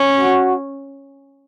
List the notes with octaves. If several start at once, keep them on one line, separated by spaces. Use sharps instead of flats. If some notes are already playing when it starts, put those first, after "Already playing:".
Already playing: C#4
F#4